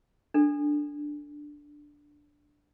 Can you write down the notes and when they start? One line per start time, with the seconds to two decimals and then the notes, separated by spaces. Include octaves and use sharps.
0.34 D4 A4